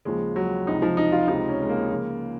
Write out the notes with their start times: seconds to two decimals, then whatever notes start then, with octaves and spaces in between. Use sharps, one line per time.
0.05 D#2 C#3 F3 G#3
0.36 F#3
0.66 C#2 C3 F3 D#4
0.82 F3
0.97 D#4
1.12 F4
1.28 C#2 C3 F3 D#4
1.49 C#4
1.63 G#3
1.69 A#3
1.90 C#2 C#3 F3